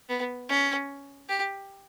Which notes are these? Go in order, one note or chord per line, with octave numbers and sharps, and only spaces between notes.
B3
C#4
G4